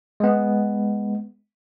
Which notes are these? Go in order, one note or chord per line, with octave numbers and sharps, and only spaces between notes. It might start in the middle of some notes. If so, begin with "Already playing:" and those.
G#3 B3